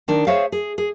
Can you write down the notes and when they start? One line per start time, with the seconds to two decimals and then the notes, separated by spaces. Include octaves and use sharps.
0.08 D#3 D4 D#4
0.27 G#4 C5 C#5 E5 F5
0.52 G#4
0.78 G#4